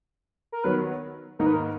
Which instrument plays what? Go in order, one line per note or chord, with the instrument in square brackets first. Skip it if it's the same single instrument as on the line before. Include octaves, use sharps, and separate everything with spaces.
[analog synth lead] A#4
[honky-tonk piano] D#3 F#3 B3 [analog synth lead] B4
[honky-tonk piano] G#2 D#3 A#3 D#4 [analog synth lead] A#4
[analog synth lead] B4
A#4